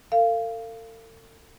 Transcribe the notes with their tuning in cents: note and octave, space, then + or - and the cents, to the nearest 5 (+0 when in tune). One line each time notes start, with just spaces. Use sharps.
A4 +45 F5 -20